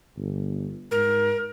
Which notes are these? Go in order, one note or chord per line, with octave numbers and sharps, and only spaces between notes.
G1
G#2 A#4